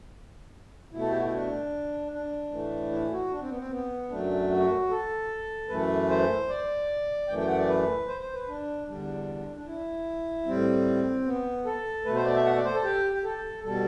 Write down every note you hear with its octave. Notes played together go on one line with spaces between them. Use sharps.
B2 A3 E4
A4
G4
F#4
E4
D4
D4
A2 E3 A3
E4
F#4
D4
C4
B3
C4
B3
F#2 F#3 A3 D4
F#4
A4
F#2 E3 A3 B4
C5
D5
F#2 E3 A3 G5
G5
F#5
D5
B4
C5
C5
B4
D4
E2 D3 G3 D4
D4
E4
A2 G3 C4
B3
A4
B2 A3 B4
C5
D5
E5
F#5
D5
C5
A4
G4
G4
A4
B2 G3 A4